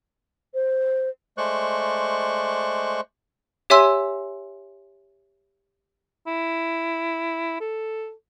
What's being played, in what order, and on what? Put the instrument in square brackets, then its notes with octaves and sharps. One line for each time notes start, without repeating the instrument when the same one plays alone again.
[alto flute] C5
[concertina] G#3 A3 C5 D5 C#6 F#6
[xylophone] G4 C#5 E5 G#5 C6 E6
[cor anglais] E4
A4